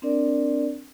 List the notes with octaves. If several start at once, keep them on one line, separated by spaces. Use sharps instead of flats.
C4 D4 A#4 D5